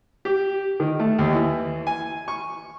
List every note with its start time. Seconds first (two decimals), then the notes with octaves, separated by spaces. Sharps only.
0.25 G4
0.80 D#3
1.00 A3
1.18 D#2
1.33 E3
1.87 G#5
2.28 C#6